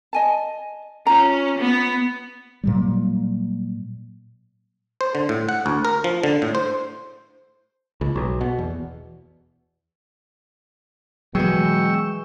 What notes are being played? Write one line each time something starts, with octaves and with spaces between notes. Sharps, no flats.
D#5 G#5 A5
C#4 F4 A#5
B3
A#2 F#3 G3
C5
D3
A2
F#5
D2
A#4
F3
D3
A2
C5
C#2
B1
B2
E2
B2 E3 F#3 G#3 G#4 G5 C#6 E6